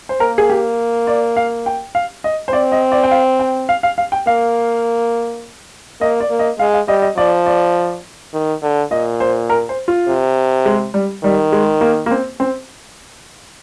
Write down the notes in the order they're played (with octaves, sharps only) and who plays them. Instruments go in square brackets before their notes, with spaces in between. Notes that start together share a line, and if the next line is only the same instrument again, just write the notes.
[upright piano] C5
[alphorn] A#3 [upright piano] A#4
[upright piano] G#4
G4
D5
F5
G5
F5
D#5
C5
[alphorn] C4 [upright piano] D5
[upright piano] D#5
D5
G5
F5
G5
F5
F5
F5
G5
[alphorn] A#3 [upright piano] F5
[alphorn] A#3 [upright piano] D#5
[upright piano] D5
[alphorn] A#3
[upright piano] D#5
[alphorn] G#3 [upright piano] F5
[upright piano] F5
[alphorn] G3 [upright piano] D#5
[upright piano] D#5
[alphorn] F3 [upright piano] D5
[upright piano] D5
[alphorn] D#3
D3
[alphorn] A#2 [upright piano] D#5
[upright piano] C5
A#4
C5
F4
[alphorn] C3
[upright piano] G#3
G3
[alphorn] D#3 [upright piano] G3
[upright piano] G#3
A#3
A#3
C4
C4